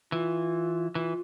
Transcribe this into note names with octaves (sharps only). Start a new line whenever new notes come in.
E3 F4
E3 F4